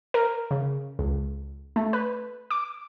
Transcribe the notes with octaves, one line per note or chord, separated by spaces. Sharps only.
A#4
C#3
C#2
A3
B4
D6